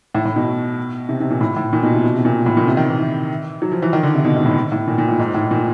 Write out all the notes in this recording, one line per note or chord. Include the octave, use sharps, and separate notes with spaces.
A2
A2
B2
C3
C3
A#2
A2
A2
A#2
B2
C3
B2
C3
A#2
A2
A#2
C3
D#3
E3
F#3
F3
E3
D#3
D3
C3
B2
G#2
A2
A2
A#2
A#2
A2
G#2
A2
A#2